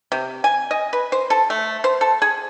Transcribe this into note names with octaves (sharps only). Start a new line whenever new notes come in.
C3
G#5
D#5
B4
C5
A4
A3
C5
A4
G#4